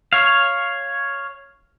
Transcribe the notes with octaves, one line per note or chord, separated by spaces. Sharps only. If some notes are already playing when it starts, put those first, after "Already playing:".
C#5 F5